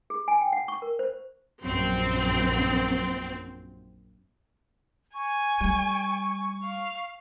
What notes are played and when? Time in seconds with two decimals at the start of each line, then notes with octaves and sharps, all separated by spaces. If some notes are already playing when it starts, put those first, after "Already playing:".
0.10 G#4
0.28 G#5
0.41 G5
0.53 F#5
0.68 C#6
0.82 A#4
0.99 C5
1.64 A#1 F#2 C4
5.14 G#5 C#6
5.61 G3 A3
6.64 F5